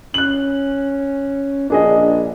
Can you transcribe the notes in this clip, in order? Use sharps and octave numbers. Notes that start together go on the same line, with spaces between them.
C#4 F#6 F#7
A#1 D4 G#4 D#5